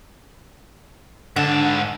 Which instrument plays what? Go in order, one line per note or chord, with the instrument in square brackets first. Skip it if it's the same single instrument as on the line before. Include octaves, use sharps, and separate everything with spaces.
[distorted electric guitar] G#2 A5 [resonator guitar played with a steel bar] D3